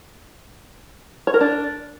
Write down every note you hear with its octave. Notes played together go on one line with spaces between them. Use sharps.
C#5
A#4
D4